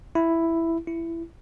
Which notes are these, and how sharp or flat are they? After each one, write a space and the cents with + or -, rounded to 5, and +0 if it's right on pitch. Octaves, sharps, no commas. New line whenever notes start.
E4 +5
E4 +15